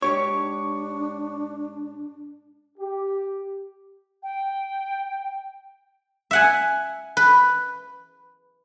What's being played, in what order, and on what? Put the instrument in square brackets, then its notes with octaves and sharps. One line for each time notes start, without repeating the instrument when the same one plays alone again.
[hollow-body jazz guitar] G#2 G4 C#5 [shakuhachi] D4 [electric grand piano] C#6
[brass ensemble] G4
[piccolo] G5
[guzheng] E5 F#5 G#5
B4